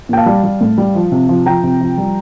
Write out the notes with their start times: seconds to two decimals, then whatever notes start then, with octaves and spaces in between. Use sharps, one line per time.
0.09 A#2 G5
0.17 F5 A5
0.26 G3
0.43 G3
0.61 A2
0.78 G3
0.95 F3
1.12 C3
1.29 F3
1.46 F3 G5 A#5
1.63 C3
1.81 F3
1.98 G3